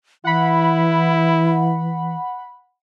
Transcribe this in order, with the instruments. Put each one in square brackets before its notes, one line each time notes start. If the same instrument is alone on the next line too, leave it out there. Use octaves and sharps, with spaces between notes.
[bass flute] E3 [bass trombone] E4 [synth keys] F#5 B5